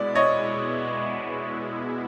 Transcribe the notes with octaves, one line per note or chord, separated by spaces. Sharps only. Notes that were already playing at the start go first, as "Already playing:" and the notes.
Already playing: B2 G#3 B3 E4 D5
C#5 D#5